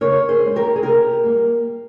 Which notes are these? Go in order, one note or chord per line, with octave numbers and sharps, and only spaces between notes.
C#3 A#4 C#5
G#4 C5
G#3 C#4
G4 A#4
G#4
C3 G4 A#4
G3 A#3